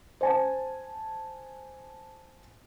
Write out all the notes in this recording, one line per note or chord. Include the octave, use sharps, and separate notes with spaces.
C5 G#5 A5